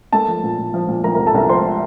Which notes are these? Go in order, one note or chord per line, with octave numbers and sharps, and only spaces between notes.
A#3 A4 A5
F3
A#2
A#2
F3
A#2
F3 A#4 A#5
A#4 A#5
C2
A4 A5
C2 A#4 A#5
F3 C5 C6